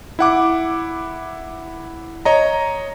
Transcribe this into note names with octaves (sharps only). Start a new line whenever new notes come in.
E4 F#5 D6
C#5 D#5 A#5